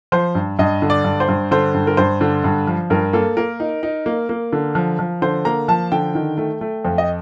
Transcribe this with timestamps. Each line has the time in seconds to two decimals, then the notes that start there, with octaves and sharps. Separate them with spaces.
0.12 F3 C5
0.35 G2
0.59 G2 D#5
0.82 D3
0.90 D5
1.04 G2
1.20 C5
1.29 G2
1.51 D3 C5
1.74 G2
1.87 A#4
1.97 G2 C5
2.21 D3
2.44 G2
2.67 F3
2.90 G2 A#4
3.13 A#3 A4
3.37 A#3 A#4
3.60 D#4
3.83 D#4
4.06 A#3
4.29 A#3
4.53 D3
4.75 F3
4.99 F3
5.22 D3 C5
5.45 A#3 A#5
5.68 F3 A5
5.92 D3 G5
6.15 D#3
6.38 A3
6.61 A3
6.85 F2
6.98 D#5